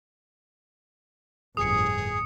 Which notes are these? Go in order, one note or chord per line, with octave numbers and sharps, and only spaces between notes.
G1 F2 A2 G#4 D#6 C#7